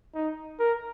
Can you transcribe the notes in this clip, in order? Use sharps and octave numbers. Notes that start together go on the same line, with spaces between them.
D#4
A#4